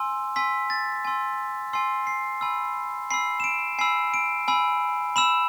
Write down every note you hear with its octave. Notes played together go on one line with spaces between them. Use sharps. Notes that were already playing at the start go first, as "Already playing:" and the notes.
Already playing: G#5 C6 E6
G#5 C6 E6 B6
A6
G#5 C6 E6
G#5 C6 E6 C7
C7
G#5 B5 E6
G#5 B5 E6 C7
E7
D7
G#5 B5 E6 C7
D7
G#5 B5 E6
B5 E6 E7